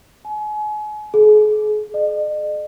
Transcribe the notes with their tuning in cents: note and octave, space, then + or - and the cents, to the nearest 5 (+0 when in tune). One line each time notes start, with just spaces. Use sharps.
G#5 +35
G#4 +40
D#5 -45